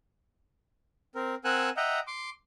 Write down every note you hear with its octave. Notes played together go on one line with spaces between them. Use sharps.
C4 A#4
C4 A#4 F#5 G#5 E6 F#6
D#5 E5 F#5 G5 A#5
C6 D6